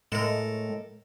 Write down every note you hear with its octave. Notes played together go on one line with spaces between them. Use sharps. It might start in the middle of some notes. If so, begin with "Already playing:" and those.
A2 G#3 A4 A#4